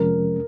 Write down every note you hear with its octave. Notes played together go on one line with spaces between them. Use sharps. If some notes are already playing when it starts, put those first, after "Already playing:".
Already playing: F2 C3 F3 G#3 C#4 A#4